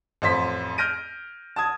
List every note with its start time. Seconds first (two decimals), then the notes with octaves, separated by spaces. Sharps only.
0.22 A1 F2 C5 B6
0.78 F6 G6 A#6 D7 D#7
1.56 A5 D#6 G#6